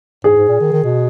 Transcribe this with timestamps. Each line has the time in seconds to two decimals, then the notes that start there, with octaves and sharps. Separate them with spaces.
0.24 G#2 G#4
0.36 G#2
0.48 A#2
0.60 D#3
0.72 D#3
0.84 B2